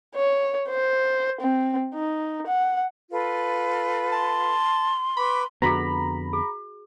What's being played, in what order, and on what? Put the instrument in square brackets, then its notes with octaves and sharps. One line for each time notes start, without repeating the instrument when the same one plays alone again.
[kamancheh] C#5
C5
C4
D#4
F#5
[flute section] F4 A4 B4
[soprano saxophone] A5 [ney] C6
[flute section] B4 C#6 D6 [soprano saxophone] B5
[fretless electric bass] F2 D3 B3 [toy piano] F#4 G#4 [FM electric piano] A#5 B5
[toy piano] G#4